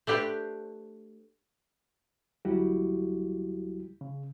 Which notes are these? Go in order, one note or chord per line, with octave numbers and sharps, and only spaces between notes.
A3 D4 G4 B4 C5
D2 F#3 G3 E4 F#4 G4
C#3